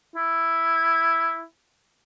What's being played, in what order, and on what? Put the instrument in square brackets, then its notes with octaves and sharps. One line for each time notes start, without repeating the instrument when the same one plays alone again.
[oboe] E4